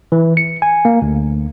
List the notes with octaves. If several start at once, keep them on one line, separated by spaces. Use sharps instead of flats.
E3
C#7
G#5
A#3
D2